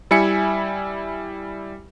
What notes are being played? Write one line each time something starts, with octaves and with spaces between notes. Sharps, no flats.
G3 E4 E5 G#5 C#7